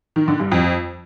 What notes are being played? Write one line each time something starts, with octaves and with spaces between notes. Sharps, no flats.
D#3
D3
G2
F2